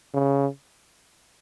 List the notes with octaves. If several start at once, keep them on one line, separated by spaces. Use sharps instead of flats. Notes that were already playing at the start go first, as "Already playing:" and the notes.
C#3